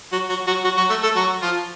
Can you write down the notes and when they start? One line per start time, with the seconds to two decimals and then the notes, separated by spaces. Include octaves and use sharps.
0.12 F#3 F#4
0.29 F#3 F#4
0.47 F#3 F#4
0.64 F#3 F#4
0.77 F#3 F#4
0.90 A3 A4
1.03 A3 A4
1.16 F#3 F#4
1.42 F3 F4